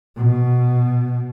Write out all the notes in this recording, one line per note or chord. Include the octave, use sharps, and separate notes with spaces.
B2